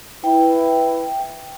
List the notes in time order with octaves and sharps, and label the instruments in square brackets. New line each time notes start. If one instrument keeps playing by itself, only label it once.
[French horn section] E4 B4 [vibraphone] G5